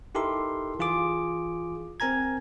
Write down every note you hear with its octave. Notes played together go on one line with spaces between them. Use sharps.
D#4 E4 G4 A4 A#4 C6
E3 F4 G#4 D6
C4 A#4 G#5 A#5 G#6